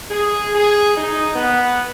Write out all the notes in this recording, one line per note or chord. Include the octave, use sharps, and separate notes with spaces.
G#4
G#4
D#4
B3